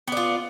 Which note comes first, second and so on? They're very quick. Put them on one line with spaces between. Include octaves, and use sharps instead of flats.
B3 D5 F4